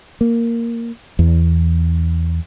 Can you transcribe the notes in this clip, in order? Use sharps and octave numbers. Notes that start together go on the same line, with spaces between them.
A#3
E2